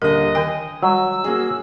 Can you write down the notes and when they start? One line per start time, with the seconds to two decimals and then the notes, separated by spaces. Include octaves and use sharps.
0.02 D#1 D3 A#4 D#5 F#6
0.35 D#3 G5 G#5
0.83 F#3 G3 E6
1.24 A#3 F#4 G#4